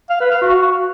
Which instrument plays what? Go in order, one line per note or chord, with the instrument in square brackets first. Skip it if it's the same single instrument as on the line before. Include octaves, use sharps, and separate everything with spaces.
[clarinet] F5
B4
F5
F#4